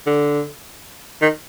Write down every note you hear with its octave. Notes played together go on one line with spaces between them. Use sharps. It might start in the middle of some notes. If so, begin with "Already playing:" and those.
D3
D#3